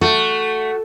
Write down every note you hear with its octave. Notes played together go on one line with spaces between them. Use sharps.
A3 F#4